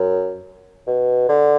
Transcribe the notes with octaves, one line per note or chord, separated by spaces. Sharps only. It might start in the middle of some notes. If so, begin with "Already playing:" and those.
Already playing: F#2
B2
D3